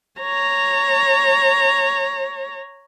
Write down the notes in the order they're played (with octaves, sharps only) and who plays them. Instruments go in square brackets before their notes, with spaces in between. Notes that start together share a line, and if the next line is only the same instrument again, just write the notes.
[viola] C#5 A#5